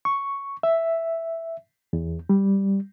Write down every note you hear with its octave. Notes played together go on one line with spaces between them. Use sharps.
C#6
E5
E2
G3